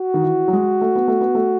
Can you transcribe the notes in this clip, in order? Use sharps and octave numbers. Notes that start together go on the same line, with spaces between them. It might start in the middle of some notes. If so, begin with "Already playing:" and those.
Already playing: F#4
D#3
E3
F#3
G#3
A3
B3
A3
B3
A3